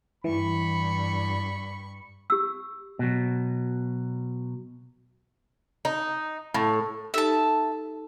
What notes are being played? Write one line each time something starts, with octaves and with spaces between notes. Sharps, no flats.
G2 E3 B5 C#6
G4 E6
B2 F#3
D#4
A2
D#4 G4 A4 E5 A5